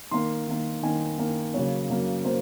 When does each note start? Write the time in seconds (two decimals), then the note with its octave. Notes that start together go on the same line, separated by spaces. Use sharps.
0.11 D#3 A#3 C6
0.48 D#3 A#3
0.83 D#3 A#3 G#5
1.18 D#3 A#3
1.54 C#3 F#3 A#3 C#5
1.90 C#3 F#3 A#3
2.25 F#3 A#3 C5